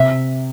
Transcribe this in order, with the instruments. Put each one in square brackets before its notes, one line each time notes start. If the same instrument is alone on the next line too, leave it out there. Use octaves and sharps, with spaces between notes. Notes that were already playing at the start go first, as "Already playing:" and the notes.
Already playing: [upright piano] C3 [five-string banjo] E5